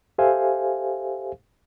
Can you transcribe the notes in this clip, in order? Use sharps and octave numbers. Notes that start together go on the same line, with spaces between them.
G4 A4 C5 E5 F5 G#5